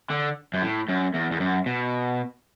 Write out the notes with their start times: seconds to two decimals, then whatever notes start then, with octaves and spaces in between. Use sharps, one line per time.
0.10 D3
0.54 F#2
0.62 A2
0.88 F#2
1.14 E2
1.31 E2
1.40 F#2
1.66 B2